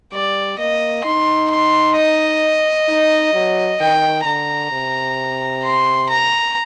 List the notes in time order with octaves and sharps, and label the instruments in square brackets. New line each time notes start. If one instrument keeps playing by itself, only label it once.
[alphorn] G3 [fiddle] D5
[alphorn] A#3 [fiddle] D#5
[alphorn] D#4 [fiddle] C6
[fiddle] C6
D#5
[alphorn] D#4
F#3
[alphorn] D#3 [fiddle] G5
[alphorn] D3 [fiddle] A#5
[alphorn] C3
[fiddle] C6
A#5